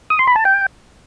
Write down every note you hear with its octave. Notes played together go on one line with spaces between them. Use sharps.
D#6
C6
B5
A5
G5